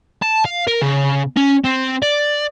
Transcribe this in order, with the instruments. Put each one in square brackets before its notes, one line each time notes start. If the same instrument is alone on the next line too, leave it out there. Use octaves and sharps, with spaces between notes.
[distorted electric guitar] A5
F5
A#4
C#3
C#4
C4
D5